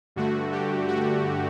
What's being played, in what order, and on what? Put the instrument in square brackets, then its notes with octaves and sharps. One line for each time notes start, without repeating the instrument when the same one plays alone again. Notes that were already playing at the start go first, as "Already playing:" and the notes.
[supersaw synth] G2 D3 A3 F#4
G4
F#4